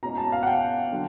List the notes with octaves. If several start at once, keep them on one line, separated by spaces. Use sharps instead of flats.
B2 G#3 C#4 E4 A#5
A5
F5
F#5
G5
D3 F#3